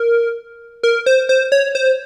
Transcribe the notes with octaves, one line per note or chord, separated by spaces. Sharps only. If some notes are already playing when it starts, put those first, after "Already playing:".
Already playing: A#4
A#4
C5
C5
C#5
C5